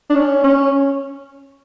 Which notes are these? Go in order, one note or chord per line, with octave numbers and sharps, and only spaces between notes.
D4
C#4
C#4